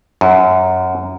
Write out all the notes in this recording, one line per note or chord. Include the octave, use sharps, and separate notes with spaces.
F#2